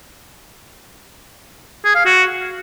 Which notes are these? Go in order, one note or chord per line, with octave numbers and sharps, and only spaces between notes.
G#4
F5
F#4